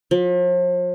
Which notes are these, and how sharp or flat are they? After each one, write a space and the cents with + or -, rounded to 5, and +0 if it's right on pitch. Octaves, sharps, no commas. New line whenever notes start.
F3 +40